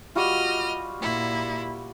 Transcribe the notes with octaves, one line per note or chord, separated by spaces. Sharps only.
G3 F4 F#4 D#5 F6
A#2 E4